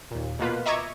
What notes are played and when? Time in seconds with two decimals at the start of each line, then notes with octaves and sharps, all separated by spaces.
0.11 D#2 A#2
0.39 B2 A#3 F4 B4
0.66 D#5 E5 A#5 C#6 D6 G#6